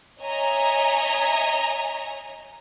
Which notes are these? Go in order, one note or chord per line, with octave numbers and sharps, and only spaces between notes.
C#5 D#5 E5 G#5 A#5